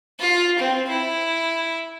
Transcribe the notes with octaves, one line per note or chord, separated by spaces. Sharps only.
F4
C4
E4